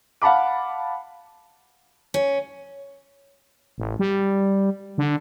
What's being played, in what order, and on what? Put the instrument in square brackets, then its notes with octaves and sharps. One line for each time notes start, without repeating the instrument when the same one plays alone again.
[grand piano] F5 F#5 A5 B5 D6
[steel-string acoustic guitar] C#4
[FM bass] A1
G3
D3